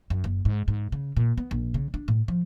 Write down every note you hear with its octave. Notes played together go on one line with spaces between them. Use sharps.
F#2
F#1
G#2
G#2
C#3
A#2
B3
A#1
C#3
D4
A2
F3